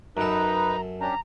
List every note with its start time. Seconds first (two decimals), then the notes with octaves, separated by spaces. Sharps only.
0.17 F#2 D#4 A4 B4 A#5
1.01 C#4 D4 G4 A#5